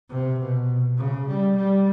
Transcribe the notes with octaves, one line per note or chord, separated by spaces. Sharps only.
C3
B2
C#3
G3
G3